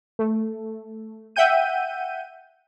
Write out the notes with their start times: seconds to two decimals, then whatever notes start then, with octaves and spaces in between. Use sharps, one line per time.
0.19 A3
1.36 E5 F#5 G5 G6 D#7